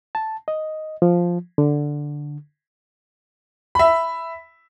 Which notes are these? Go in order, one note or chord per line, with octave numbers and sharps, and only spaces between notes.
A5
D#5
F3
D3
E5 B5